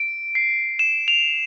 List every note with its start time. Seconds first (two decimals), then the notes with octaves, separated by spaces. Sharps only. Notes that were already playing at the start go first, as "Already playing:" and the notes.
Already playing: D7
0.35 C7
0.79 E7
1.08 F7